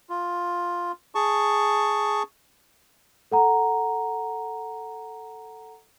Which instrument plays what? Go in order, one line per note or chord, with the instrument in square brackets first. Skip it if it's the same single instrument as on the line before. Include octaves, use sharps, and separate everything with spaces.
[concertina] F4
G#4 A5 C#6
[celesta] A4 F#5 A#5